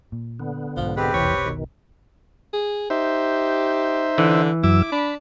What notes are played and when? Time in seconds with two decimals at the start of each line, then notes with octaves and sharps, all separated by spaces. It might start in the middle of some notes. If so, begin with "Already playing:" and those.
0.12 A#2
0.39 D3 B3
0.77 B1 G#2 F3
0.97 G#3 C4 G4 B4
1.14 F1 B1 E2 C3 E3 C#4 C#5
1.46 B2 D#3
2.53 G#4
2.90 D#4 G4 C5 E5
4.18 D3 E3
4.63 F#2 F#3 E4 D6 E6
4.92 D4 B5